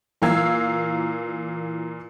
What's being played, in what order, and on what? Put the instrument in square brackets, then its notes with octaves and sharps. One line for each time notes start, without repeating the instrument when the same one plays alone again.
[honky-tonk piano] A#2 E3 A#4 F5 E6 G#6